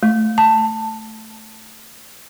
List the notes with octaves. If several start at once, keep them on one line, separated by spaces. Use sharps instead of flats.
A3
A5